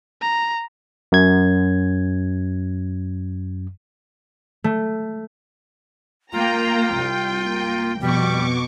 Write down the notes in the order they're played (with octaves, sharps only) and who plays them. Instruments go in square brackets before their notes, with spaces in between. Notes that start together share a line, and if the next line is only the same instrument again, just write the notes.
[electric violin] A#5
[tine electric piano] F#2 G#6
[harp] A3
[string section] A#3 A#5 [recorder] F4 [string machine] G5
[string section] C2
A#3
[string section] F2 [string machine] B2 C#6 D6 [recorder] G3